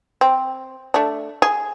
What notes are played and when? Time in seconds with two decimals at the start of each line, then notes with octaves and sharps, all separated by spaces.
0.21 C4
0.94 A3 D4
1.42 G#4